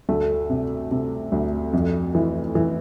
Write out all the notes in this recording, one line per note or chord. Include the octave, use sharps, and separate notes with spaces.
D2 A3
C3
C3
D2
F2
E3
E3